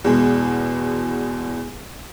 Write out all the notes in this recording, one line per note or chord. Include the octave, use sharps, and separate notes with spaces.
E2 B2 G#3